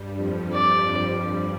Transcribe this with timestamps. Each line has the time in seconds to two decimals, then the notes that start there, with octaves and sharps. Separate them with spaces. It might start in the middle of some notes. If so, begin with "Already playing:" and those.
Already playing: G2 G3
0.17 F2 F3
0.54 D5
1.26 G2 G3